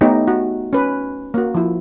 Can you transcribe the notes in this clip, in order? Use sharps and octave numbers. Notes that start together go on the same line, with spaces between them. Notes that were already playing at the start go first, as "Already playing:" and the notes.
A3 B3 D#4 G4 C#5
F#4
C#4 B4
A#3 F#4
F3 E4